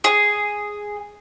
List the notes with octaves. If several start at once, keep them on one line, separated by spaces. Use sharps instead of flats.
G#4